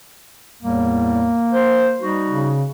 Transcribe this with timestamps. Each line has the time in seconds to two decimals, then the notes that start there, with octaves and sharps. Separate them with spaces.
0.63 E2 A2 G3 A#3
1.52 C5
1.99 G3 D#4 F#4
2.27 C#3